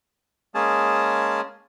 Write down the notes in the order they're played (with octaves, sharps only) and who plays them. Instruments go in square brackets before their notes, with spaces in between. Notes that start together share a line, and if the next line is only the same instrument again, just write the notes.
[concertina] G#3 A#3 C#4 G#4 A5